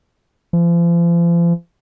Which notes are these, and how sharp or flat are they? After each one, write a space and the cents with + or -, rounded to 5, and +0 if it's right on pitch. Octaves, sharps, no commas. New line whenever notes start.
F3 -40